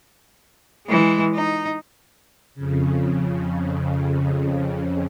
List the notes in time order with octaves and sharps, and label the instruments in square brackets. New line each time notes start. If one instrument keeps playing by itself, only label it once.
[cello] E3 G#3
D#4
[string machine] F2 C#3